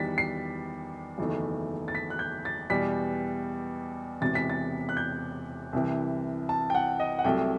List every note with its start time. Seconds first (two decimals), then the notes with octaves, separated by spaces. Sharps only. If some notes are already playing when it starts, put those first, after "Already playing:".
Already playing: E2 D#3 G3 A6 B6
0.18 C7
1.18 F#1 E2 D#3 A3
1.88 A6
1.95 B6
2.10 F#6
2.19 G6
2.45 A6
2.70 E2 B2 G3 B6
4.21 E1 E2 C3 A6
4.35 B6
4.50 A6
4.89 F#6
4.97 G6
5.73 C2 C3 E3
6.49 A5
6.70 G5
6.75 F#5
7.00 D#5
7.19 F#5
7.24 C2 C3 F#3 A3 G5